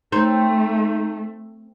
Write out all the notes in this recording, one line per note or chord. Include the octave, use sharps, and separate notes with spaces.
A3 C4 D#4